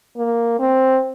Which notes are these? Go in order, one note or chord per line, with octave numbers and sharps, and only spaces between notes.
A#3
C4